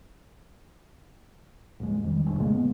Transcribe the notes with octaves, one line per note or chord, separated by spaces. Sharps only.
A1 D#2 G#3
F2 D#3 G3
G1 C2
A2 C#3 G#3 A#3
B3